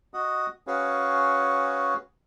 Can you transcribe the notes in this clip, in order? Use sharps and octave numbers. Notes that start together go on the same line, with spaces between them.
F#4 D#5 F#5 D#6
C#4 F#4 G#4 B4 C#5 F5